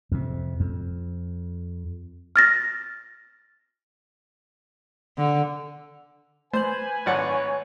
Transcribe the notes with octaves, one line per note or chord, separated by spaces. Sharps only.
F2 C3
F2
F6 A6 A#6
D3
A3 B4 C5 G#5 G6 F#7
G#1 C#5 D5 F#5